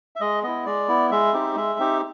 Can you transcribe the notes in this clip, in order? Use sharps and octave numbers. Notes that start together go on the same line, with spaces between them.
E5
G#3 D#5
B3 E4 D#5
G#3 D5
B3 E4
G#3 E5
C4 D#4 G4
G#3 E5
C4 D#4 G4